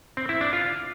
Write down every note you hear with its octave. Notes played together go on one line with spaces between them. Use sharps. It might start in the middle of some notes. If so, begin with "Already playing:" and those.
C4
E4
D4
F4